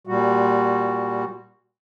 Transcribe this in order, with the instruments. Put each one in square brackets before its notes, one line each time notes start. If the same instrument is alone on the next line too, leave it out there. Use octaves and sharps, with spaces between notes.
[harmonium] A#2 G3 F#4